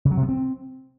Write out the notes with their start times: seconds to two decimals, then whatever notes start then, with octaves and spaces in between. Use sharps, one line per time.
0.05 C#3
0.11 F#3
0.17 C3
0.23 B3
0.29 C4